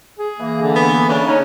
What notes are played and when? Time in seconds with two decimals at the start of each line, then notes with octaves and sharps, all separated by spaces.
0.19 G#4
0.39 E3 A#3
0.62 D3
0.76 B3
1.09 C#3 D4
1.26 C#4 D#4